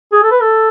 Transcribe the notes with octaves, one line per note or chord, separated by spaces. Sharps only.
G#4
A4
B4
A4